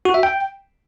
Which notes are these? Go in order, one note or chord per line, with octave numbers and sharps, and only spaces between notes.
F#4
E5
G5